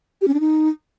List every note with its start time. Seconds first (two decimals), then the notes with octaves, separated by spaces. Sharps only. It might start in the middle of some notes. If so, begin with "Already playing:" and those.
0.21 G4
0.28 C#4
0.34 D4
0.40 D#4